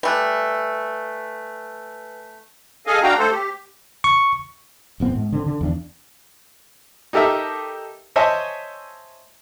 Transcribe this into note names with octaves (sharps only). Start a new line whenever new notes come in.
G3 A3 B4 G#5 F#6
G#4 A4 D#5 F5 G#5
D4 F#4 F5 G5 A#5
A3 A4 C5
G4
C#6
D1 A1 B3 C4
G#2
D3 C4
D3
E2 D#3 D4
D#4 G4 A4 A#4 E5
C5 C#5 D#5 E5 G#5 A5